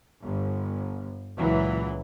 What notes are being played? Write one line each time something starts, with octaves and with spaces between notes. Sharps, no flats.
G1
C#2 A#2 E3 F#3